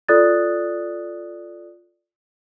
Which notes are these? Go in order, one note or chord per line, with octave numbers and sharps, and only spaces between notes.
F4 A4 D5 D#6 F#6 A6